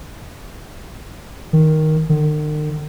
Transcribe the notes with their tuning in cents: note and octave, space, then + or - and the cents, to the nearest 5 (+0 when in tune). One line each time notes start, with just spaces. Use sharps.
D#3 +5
D#3 -45